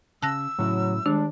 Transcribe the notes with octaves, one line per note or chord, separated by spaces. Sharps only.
C#3 A5 E6 F#6 A#6
A2 C#3 F#3 E4
D#3 G3 G#3 D4